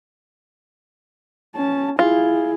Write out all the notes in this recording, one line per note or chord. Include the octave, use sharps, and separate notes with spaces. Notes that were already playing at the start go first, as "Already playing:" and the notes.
C#4 A5
E4 F4 G#4